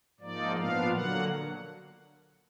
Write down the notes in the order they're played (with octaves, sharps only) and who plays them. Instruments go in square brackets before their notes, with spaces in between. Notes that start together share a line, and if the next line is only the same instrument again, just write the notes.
[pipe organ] G#2 F3 A#3 D#4 D5
A#2 F3 B3 D4 F5
D3 F#3 A#3 F#5